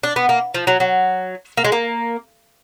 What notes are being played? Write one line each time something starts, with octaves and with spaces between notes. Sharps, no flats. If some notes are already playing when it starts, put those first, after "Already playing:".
D4
B3
A#3
F3
F#3
F#3
A#3
G#3
A#3